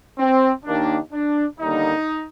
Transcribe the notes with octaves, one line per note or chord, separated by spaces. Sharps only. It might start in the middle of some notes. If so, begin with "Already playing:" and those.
C4
D#2 D#3 A#3 D4
D4
D#2 D3 G3 A#3 D#4